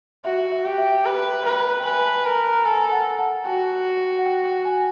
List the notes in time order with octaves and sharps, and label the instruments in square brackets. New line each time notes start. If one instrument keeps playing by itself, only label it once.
[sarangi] F#4 [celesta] E5
[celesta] E5
[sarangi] G4
[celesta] E5
[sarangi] B4
[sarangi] B4 [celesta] G5
[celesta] G5
[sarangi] B4 [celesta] G#5
[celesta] A5
[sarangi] A#4 [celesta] A#5
[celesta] A5
[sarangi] A4 [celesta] G#5
[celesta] F#5
F#5
[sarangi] F#4 [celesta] G5
[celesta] F#5
G5
G5
G#5